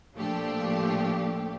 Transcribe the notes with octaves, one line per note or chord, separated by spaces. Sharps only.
A#2 F3 A3 D4 G4